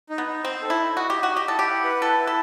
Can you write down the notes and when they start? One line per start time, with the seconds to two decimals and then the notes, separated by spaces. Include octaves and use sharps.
0.10 D#4
0.18 B3
0.26 D#4
0.44 C4 C5
0.62 A4
0.70 E4
0.80 D#4
0.97 F#4 D#5
1.10 G4
1.14 D#4
1.23 F#4
1.32 G4 D#5
1.48 E4 A4
1.59 G4
1.67 F#5
1.84 B4
2.02 E4 A4
2.19 E4
2.27 A4